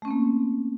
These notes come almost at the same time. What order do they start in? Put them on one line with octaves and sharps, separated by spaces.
A3 C#4 C4 A#3